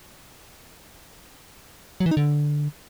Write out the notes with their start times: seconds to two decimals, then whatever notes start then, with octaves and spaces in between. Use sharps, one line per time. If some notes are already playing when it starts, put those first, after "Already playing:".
2.00 F#3
2.06 E3
2.11 D#4
2.17 D3